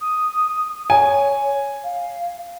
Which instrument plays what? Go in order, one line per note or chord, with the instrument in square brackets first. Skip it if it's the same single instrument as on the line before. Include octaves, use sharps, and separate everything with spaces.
[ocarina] D#6
[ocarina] C#5 [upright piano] G#5
[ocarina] F5